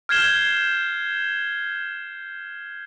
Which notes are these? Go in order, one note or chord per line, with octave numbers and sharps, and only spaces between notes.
F6 G6 G#6 C7 E7 G7